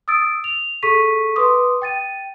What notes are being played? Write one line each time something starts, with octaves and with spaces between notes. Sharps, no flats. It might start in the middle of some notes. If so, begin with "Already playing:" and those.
D#6 E6 A6 D7
F7
G#4 A4 C#6 B6 D#7
B4 C6 D6 D#6
G5 A6 D#7